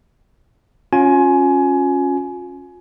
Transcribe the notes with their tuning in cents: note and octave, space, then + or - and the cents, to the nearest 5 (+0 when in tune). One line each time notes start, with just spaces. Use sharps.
C#4 -10 F4 +35 G#5 +20